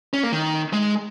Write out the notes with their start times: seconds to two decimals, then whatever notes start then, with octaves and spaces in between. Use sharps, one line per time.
0.13 C#4
0.23 A#3
0.32 D#3
0.73 G#3